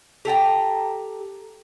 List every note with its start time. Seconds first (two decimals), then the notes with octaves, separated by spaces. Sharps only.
0.25 G4 A4 G5 A#5